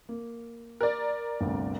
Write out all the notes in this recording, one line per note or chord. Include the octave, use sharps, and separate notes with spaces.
A#3
A#4 D5
G1 D2 C3